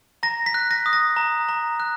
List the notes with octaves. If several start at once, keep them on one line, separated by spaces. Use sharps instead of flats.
A#5 A#6
B6
F#6
A#6
D#6
A#6
A#5
A#5
F#6